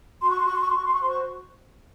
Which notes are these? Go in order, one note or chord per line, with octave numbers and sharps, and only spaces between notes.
F#4 C6
C#6
C6
C#6
F#4
C6
C#6
C6
F#4 C#6
C6
C#6
C5 C6
C#6